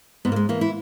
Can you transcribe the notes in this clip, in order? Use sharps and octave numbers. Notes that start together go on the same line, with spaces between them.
G#2 B3
A#3
G#3
E3 A#3
E4